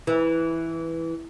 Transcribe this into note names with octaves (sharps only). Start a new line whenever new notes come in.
E3